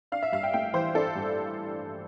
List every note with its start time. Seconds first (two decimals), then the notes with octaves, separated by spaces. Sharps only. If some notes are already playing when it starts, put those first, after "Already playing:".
0.12 D4 F5
0.23 E5
0.32 G2 F5
0.43 G5
0.53 A3 G5
0.73 E3 C5
0.95 D4 A4
1.15 G2